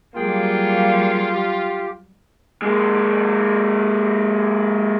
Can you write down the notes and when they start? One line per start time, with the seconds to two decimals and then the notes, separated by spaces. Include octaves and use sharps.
0.16 F#3 G3 A#3 F4 G#4 G5
1.33 G4
2.62 G#3 A#3